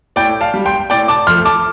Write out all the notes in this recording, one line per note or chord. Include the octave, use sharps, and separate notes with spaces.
A2 D5 G5
F5 A5
G3
G5 C6
A2 D5 G5
A5 D6
F3 A3 C6 F6
A5 D6